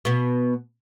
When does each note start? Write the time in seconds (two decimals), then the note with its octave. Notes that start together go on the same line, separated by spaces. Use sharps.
0.05 B2 B3